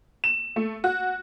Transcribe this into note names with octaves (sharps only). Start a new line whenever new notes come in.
E7
A3
F#4